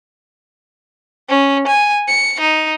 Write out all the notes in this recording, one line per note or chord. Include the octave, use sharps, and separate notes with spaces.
C#4
G#5
C#7
D#4